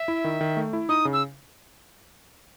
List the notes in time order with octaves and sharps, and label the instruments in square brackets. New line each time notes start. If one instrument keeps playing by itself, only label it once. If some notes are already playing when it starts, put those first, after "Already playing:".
Already playing: [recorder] E5
[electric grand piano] E4
D#3
D#3
A3
E4
[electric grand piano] D#4 [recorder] D#6
[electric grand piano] C#3
[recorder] E6